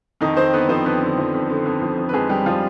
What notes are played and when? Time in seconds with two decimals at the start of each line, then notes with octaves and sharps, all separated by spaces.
0.21 F2 D#3 D#4
0.37 F2 C4 C5
0.53 D3 B3 B4
0.69 F3 C4 C5
0.85 F2 B3 B4
1.02 D3
1.18 F3
1.34 F2
1.50 D3
1.66 F2
1.82 F3
1.98 F2
2.09 B4
2.13 F2 G#3 G#4
2.29 F2 G3 G4
2.46 F3 F4